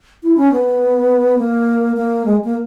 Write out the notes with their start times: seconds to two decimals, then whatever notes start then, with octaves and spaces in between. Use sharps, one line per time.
0.23 E4
0.37 C#4
0.52 B3
1.38 A#3
1.97 A#3
2.25 G#3
2.44 A#3